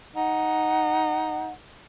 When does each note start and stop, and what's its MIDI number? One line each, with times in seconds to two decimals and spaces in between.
0.16 1.51 63
0.16 1.51 78